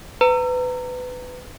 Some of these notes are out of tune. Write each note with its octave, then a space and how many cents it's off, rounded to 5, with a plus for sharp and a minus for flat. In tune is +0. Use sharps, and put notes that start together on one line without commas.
B4 +25 A#5 -25